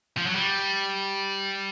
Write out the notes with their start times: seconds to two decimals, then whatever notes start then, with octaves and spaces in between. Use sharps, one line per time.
0.17 F3
0.27 F#3
0.35 G3